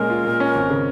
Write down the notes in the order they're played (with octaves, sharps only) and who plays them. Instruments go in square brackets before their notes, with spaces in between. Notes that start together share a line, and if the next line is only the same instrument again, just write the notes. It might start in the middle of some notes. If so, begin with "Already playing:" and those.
Already playing: [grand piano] A#2 G#3 C#4 [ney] A#4
[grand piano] F4
A#2
C#4
G#1
C#3